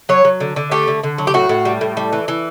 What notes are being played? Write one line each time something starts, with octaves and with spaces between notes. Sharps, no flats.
F#3 C#5
F#3
D3
D3
A3 G4
D3
D3
F#3
G4
A2 F#4
A2
G3
A2
G3
E3
E3